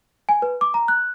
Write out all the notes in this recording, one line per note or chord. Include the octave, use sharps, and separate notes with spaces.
G#5
B4
D6
A#5
F#6